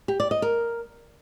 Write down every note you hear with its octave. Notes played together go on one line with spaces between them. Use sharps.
G4
D5
D#5
A#4